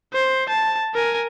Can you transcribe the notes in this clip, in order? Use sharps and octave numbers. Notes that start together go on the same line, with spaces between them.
C5
A5
A#4 G#5